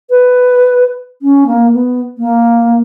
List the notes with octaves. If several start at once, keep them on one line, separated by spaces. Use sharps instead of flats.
B4
C#4
A#3
B3
A#3